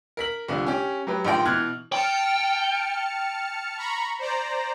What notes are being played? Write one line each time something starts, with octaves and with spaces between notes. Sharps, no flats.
A#4 B6 F#7
C2 D3 F3
C#4 G4
F#3 G4 B4
A#1 D#3 F3 G5 C6
B2 E3 F6 F#6 G#6
G5 A5 F6 C#7
A#5 B5 C#6
C5 D5 A#5